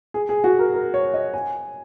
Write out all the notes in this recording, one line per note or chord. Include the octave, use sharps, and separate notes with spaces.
G#4
G#4
F#4
A#4
A#4
C#5
D#5
G#5